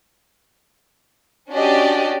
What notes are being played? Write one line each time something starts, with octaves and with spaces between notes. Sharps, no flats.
C#4 D4 F#4 G4 D5 D#5